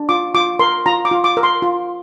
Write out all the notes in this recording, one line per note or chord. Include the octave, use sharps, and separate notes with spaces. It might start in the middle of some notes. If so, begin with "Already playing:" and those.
Already playing: D4
F4 D6
F4 D6
A#4 C6
F4 A#5
D6
F4
D6
A#4
C6
F4